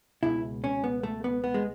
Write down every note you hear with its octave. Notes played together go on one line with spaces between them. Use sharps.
C#2 B2 E4
C#4
B3
A3
B3
B3
G#3